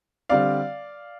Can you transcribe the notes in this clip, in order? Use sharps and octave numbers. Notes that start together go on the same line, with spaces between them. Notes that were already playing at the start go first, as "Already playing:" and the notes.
D3 G3 C4 D5 F5